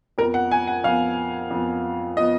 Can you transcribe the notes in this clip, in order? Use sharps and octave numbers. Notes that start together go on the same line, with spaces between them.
F2 F3 B3 A#4
F#5
G#5
F#5
F2 F3 B3 F5
F2 F3 B3
F3 B3 D#5